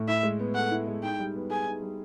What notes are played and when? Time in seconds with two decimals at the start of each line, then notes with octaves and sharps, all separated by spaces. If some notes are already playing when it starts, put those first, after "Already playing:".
Already playing: A2
0.08 E4 E5
0.23 G#3
0.39 B3
0.55 A4 F#5
0.71 E4
0.87 G#3
1.03 D#4 G5
1.19 G3
1.35 B3
1.50 G#4 G#5
1.66 D#4
1.82 G3